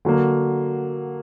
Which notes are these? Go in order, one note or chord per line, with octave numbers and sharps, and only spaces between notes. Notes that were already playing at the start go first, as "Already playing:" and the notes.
D3 F#3 A#3